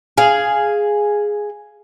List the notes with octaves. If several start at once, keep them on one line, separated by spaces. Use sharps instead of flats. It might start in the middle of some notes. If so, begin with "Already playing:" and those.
G#4 F5